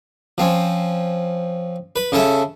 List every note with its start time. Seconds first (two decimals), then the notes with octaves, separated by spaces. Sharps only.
0.38 F3 C4 C#4
1.96 B4
2.12 C#3 C#4 A4 E5